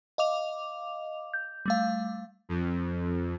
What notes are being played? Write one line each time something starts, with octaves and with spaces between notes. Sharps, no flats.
D#5 F5 D6 F7
G6
G3 A3 F5
F2